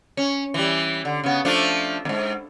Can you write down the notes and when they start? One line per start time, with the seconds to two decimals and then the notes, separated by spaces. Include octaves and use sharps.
0.17 C#4
0.54 E3 G3
1.05 D3
1.24 C#3 B3
1.45 F3 A3 D4
2.05 E2 G#2